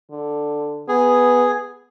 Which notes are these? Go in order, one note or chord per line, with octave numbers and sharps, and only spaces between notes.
D3
B3 G#4